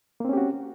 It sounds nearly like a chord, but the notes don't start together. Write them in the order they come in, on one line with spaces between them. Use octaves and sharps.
A#3 C4 C#4 G4 F#4